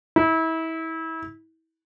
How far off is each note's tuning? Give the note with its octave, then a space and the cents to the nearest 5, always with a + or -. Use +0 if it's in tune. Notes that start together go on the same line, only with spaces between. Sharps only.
E4 -30